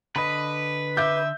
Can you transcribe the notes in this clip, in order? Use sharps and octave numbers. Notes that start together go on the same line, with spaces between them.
D3 B4 D#5 B5
E5 D6 G6